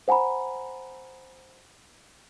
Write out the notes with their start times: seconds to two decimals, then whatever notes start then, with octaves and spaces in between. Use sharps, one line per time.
0.08 C5 F#5 G#5 A#5 B5